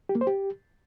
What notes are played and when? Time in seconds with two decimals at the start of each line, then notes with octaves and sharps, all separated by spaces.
0.09 G4
0.15 A#3
0.21 C5
0.27 G4